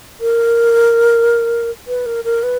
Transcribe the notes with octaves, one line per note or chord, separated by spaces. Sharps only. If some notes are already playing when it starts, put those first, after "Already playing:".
A#4
B4
A#4
A#4
B4